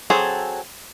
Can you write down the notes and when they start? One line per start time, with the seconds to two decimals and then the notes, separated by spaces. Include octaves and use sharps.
0.10 F#3 C4 G#4 A4